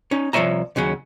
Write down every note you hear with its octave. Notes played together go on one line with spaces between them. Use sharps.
C#4 D#4
C2 F3 G#3 C#5 E5 A#5
D#2 C#3 F#3 C#4